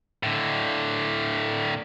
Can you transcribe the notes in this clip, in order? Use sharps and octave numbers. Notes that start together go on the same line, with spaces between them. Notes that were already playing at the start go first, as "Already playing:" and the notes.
A2 D3